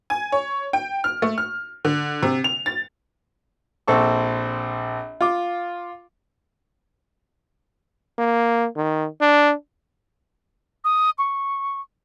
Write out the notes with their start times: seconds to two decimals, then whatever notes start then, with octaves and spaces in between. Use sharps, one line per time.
0.10 G#5
0.32 C#5
0.73 G5
1.04 F6
1.22 A3
1.38 F6
1.85 D3
2.23 C3
2.44 F7
2.66 A6
3.88 A#1 C4 A4 C#6
5.21 F4 D6
8.18 A#3
8.76 D#3
9.21 D4
10.85 D#6
11.18 C#6